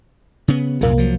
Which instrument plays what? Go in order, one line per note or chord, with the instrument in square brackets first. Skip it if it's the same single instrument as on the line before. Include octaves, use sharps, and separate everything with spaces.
[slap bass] C#3 B3
[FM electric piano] C2 A#3 [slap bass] F#2 A#2 C#3
[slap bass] F3 F#3